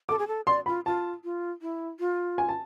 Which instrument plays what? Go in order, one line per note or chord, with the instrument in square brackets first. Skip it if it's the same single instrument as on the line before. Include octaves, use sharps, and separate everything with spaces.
[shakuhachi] A4 [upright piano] D6
[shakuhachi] G#4
A4
[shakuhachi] D5 [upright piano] C6
[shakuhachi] F4 [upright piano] B5
[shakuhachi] F4 [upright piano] A5
[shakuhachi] F4
E4
F4
[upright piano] G#5
A5